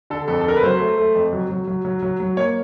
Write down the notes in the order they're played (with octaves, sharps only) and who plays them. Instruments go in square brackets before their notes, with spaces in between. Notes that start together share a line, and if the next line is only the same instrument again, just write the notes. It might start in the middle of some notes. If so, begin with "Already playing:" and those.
[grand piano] D3 A4
F2 A4
A4
D3 A#4
B4
F#3 C5
A3
A3
F2
F#3
F#3
F#3
F#3
F#3
F#3
A#3 C#5